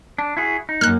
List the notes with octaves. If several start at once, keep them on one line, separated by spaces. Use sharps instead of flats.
D4
E4 F#4 G#4
D#4
F#2 A#3 F6 F#6